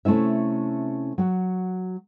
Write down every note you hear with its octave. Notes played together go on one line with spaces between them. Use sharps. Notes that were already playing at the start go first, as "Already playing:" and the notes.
C3 A3 C#4 E4 E5
F#3 F#4